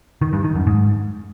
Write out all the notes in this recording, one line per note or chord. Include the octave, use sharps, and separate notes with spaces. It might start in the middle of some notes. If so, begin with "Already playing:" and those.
D#3
G2
D#3
F#2
G#2